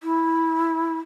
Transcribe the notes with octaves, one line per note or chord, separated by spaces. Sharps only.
E4